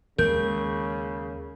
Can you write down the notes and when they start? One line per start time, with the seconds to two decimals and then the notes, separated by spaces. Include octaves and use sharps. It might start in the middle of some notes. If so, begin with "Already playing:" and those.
0.18 D#2 C#3 G#3 A#4 G6